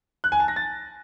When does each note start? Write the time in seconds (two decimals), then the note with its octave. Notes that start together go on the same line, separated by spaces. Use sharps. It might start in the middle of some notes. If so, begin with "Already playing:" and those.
0.24 F#6
0.32 G#5
0.40 A5
0.48 A#6
0.56 A6